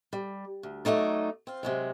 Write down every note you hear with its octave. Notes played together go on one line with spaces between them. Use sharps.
G3
D2
F#3 G3 A3 D#4 D5
C4 F4
C3 F#3 G#3